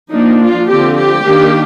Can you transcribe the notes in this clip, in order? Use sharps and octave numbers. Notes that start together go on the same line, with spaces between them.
F3 A#3 D4 D#4
F4
D3 F3 C4 G4
G4
D#3 A#3 D4